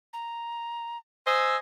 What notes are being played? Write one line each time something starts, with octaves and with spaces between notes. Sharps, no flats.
A#5
C5 D#5 G#5 E6